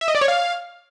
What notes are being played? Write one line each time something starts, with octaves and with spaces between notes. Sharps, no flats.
E5
D#5
D5
C#5
F5